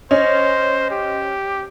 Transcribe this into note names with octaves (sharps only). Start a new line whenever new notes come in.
C#4 C5 D#5
G4